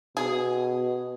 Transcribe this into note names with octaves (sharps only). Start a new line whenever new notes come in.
B2 G#4